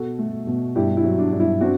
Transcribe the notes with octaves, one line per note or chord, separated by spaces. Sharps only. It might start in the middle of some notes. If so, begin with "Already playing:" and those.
Already playing: B2 F#4 A4
A3
B2
G2 E4 G4
E4
F#3
D4
G2
E4
C4 D4 F#4